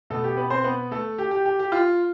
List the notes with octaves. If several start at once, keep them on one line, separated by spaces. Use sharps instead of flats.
B2 A3 B3 A4
G4
B3 B4
C4 C5
B3 B4
A3 A4
G4
G4
G4
G4
F4